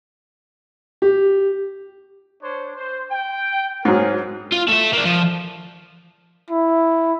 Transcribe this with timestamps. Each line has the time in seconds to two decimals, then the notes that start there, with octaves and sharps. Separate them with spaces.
1.02 G4
2.43 D4 C5 C#5
2.75 C5
3.11 G5
3.85 G#2 F#3 G#4 A#4
4.52 F4
4.68 A3 E5
4.93 A#3 D4
5.05 F3
6.50 E4